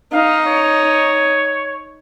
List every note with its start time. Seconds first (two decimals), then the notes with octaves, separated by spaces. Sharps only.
0.13 D#4 F5
0.47 C#5